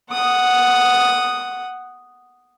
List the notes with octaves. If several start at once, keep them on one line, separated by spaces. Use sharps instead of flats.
F#5 D#6